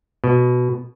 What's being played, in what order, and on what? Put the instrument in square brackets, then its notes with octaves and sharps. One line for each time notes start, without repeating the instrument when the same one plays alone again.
[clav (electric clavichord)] B2